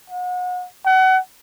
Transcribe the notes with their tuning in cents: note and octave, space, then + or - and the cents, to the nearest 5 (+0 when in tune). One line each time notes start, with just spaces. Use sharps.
F#5 -35
F#5 +30